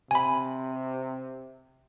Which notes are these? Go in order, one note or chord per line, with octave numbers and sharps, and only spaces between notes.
C3 G#5 B5